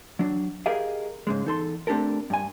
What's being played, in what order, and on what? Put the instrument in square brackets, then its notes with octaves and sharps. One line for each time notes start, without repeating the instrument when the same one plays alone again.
[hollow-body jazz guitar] F#3 D4
G4 G#4 A#4 D#5 F5
G#2 C#3 G#3
E2 D#4 A4 C6
A3 C4 D4 G4 A4 A#4
G2 G#5